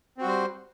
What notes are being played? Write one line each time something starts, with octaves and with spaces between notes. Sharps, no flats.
G3 C4 F#4 C5